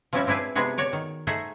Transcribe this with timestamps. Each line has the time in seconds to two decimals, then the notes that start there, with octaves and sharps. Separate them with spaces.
0.13 F3 G3 C4 C#4 E4 F#4
0.27 C4 D4 E4 G#4 B4
0.55 C3 G#3 B3 D4 F#4 G#4
0.78 F#4 C#5 D5
0.93 D#3
1.27 A3 D#4 G#4 C5 E5 F#5